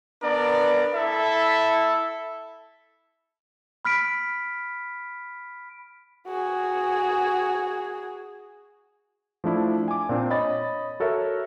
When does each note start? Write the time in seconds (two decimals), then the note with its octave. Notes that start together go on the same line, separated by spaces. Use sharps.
0.22 B3 D4 A#4 D5
0.94 E4 A4 E5
3.85 B5 F6 B6 D7
6.27 F#4 G#4
9.44 F3 A3 D4 E4
9.88 G#5 D6
10.09 A#2 C4 D4
10.30 C#5 D#5 B5 A6
11.00 F#4 A4 A#4 C#5 E5